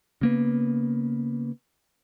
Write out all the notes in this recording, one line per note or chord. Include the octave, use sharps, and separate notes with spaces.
C#3 A#3 B3